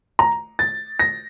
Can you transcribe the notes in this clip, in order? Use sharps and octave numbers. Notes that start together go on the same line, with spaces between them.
A#5
A6
A#6